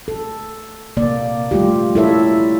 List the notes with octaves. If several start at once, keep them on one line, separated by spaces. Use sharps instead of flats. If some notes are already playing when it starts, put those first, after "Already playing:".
A4
C3 A#3 D5
G3 A3 F4 G4
E4 G4 A4 A#4 C#5 E5